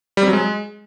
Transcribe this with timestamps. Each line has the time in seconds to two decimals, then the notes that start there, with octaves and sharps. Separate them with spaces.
0.17 G3
0.22 C4
0.28 F#3
0.33 G#3